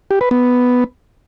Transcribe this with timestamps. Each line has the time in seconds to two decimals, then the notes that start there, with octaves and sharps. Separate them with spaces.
0.11 G4
0.21 B4
0.31 B3